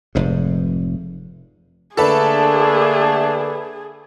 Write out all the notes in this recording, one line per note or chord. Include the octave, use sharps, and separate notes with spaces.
F1 G#2
D3 A3 A#3 D4 G#4 A4 B4